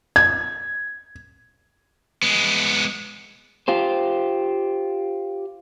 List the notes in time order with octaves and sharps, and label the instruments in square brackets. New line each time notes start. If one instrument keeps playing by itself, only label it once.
[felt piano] G#6
[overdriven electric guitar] G#3 B3
[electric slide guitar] F4 G4 C5